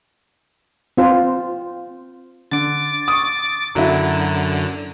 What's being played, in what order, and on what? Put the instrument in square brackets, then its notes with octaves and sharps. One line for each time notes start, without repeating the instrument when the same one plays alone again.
[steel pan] C4 F4 C5
[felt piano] D3 [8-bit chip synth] D6 A6
[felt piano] C#6 D#6
[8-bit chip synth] F#2 D3 [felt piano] F#3 E4